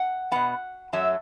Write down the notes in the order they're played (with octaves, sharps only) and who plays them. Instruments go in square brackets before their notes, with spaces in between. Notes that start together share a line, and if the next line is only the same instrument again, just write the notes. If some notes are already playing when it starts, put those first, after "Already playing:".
Already playing: [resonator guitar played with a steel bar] F#5
B2 B3 F#5
F#2 F#3 A3 E5